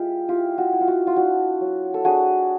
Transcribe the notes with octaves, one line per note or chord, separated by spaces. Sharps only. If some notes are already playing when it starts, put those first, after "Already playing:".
Already playing: G#3 E4 F4 G4
E4 F4 G4
F#4
E4
F4
F#4
F4
D4 F#4
F#3
A4
D4 F#4 G#4